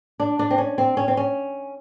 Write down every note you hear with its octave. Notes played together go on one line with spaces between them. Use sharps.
D4
D4
C4
C#4
C4
C#4
C4
C#4